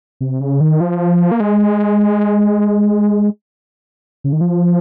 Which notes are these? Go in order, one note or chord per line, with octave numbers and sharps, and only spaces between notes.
C3
C#3
D#3
F3
A#3
G#3
C#3
D#3
F3